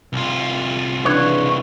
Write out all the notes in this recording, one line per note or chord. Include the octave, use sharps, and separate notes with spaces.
C2 F4
C#3 E3 D4 B4 C#5